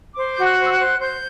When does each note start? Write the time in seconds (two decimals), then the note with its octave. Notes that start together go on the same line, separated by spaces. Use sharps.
0.16 C5 D6
0.34 F#4 G6
0.44 F#6
0.58 C5
0.65 E6
0.72 F#6
0.79 C5
1.00 C5 G6